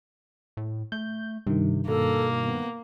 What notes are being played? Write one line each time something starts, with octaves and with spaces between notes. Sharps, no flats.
A2
A3 G6
G2 C3 D#3
B2 A#3 A4
B3